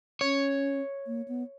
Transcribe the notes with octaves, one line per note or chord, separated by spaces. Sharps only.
C#4 C#5
A#3
B3